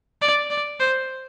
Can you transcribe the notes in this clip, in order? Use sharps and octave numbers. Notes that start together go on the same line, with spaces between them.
D5
D5
C5